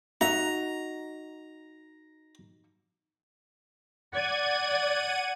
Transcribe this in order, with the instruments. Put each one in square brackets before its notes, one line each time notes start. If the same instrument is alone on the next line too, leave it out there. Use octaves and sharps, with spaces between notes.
[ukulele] D#4 F#4 E5 [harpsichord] A#5
[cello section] D5 [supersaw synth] F#5 G#6 D#7